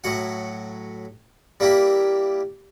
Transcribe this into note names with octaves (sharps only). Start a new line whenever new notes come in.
A2 F#3 F#5
G3 A#3 E4 G4